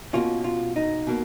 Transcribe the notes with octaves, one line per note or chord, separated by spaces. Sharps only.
B2 A#3 C#4 F4
F4
D#4
B2 A#3